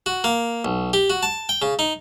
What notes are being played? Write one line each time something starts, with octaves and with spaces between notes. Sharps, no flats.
F#4
A#3
B1
G4
F#4
A5
G5
C#3
D#4